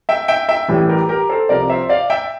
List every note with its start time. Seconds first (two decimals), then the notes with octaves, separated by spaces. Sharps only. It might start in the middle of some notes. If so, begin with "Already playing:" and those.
0.09 E5 G5
0.28 E5 G5
0.49 E5 G5
0.68 A1 A2 E3 G3
0.89 G4 A#4
1.09 G4 A#4
1.29 A4 C5
1.49 C2 C3 F3 A#4 D5
1.70 C5 E5
1.89 D5 F5
2.10 E5 G5